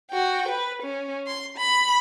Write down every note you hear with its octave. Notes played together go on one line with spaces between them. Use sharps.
F#4 G5
B4
C#4
C6
B5